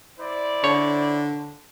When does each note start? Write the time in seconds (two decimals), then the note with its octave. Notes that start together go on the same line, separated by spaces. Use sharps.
0.20 E4 C5 D5
0.64 D3 C#5